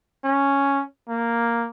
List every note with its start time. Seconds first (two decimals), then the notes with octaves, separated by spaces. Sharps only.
0.25 C#4
1.09 A#3